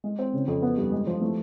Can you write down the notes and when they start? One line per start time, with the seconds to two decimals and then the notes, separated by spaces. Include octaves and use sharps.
0.04 G#3
0.19 C4
0.34 C#3
0.48 F2
0.62 B3
0.77 G2
0.92 G#3
1.07 F3
1.21 A3